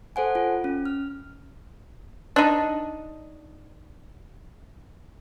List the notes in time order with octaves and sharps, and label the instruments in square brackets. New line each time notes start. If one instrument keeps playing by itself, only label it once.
[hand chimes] A4 C5 F#5 G#5
F4
C#4
F6
[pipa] D4 D#4